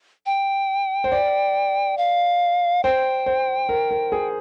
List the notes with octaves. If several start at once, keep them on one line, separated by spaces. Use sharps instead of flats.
G5
C5
D5
F5
C5 G5
C5
A#4
A#4
G#4